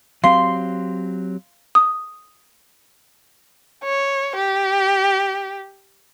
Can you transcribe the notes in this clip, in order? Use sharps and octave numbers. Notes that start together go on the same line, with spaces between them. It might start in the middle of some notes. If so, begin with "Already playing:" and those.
F#3 C4 G4 F5 C6
D#6
C#5
G4